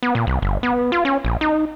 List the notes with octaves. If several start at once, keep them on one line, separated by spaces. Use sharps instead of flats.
B3
A#2
C2
G1
B3
F4
C#4
A#1
D#4